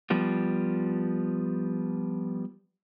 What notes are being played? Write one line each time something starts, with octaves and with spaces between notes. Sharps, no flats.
F3 G3 B3